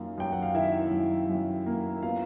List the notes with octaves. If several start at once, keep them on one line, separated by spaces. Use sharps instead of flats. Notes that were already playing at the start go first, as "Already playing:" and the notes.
Already playing: F#2 D#3 A#3 F4 F5
F#2 G5
F#5
F5
D#3 E4 E5
F#2
F#2
A#3
B3 F4 F5